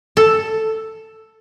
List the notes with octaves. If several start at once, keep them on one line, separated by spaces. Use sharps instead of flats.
A4